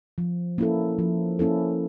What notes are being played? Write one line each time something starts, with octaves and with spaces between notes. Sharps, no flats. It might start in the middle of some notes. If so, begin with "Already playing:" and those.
F3
A#3 C#4 E4 A4
F3
A#3 C#4 E4 A4